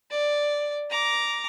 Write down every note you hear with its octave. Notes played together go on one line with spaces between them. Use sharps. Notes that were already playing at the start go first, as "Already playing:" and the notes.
D5
A#5 D6